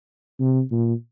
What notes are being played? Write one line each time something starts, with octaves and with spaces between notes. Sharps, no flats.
C3
A#2